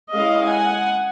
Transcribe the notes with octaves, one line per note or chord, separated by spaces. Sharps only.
G#3 C#4 E4 D#5 F5
F#5 G#5